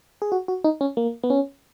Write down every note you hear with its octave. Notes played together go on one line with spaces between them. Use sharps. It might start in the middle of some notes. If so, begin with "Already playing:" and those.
G#4
F#4
F#4
D#4
C#4
A#3
B3
C#4